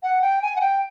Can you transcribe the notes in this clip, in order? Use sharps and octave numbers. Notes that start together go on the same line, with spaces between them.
F#5
G5
G#5
F#5
G5